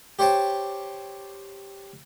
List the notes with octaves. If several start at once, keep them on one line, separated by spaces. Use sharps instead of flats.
G4 C5 C#5 G5 A5